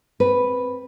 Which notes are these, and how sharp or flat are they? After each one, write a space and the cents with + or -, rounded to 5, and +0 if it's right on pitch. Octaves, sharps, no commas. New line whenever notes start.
C4 +0 B4 +0